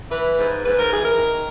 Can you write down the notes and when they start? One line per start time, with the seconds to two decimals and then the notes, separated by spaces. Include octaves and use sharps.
0.12 E3 B4
0.38 G#2
0.64 G#2 B4
0.78 A#4
0.91 E3 G#4
1.05 A#4
1.17 D#3